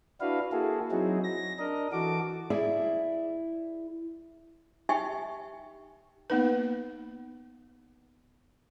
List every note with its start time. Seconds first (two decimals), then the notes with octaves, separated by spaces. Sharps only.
0.21 D4 E4 F#4 B4 F5
0.52 A#3 E4 F#4 G#4 A4
0.91 F#3 C4 D#4 E4 F#4 G#4
1.24 A#6
1.59 D4 A#4 D#5
1.92 E3 F#4 A4 D6
2.50 E4 G#4 D5 E5
4.89 D#4 G4 E5 G5 G#5 C#6
6.30 A#3 B3 D#4 B4